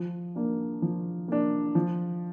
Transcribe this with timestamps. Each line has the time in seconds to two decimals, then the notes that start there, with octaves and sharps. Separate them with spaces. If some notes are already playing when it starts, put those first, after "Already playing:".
Already playing: F3
0.35 A#3 D4
0.82 F3
1.28 A#3 D4
1.75 F3